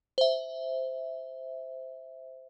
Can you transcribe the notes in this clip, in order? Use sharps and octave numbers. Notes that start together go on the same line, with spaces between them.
C5 E5